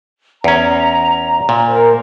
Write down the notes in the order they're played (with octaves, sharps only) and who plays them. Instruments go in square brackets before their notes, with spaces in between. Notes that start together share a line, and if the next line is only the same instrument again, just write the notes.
[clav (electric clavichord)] E2 C#4 [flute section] A#5
[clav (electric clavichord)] A#2
[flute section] A#4 C5